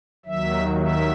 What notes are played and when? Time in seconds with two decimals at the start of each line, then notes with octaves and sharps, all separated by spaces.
0.26 D#2 D#3 F#3 E5
0.80 E5